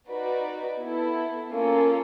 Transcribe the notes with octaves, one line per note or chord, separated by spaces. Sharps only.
D#4 F#4 B4 D5
B3 E4 A4
A#3 C#4 F4 A4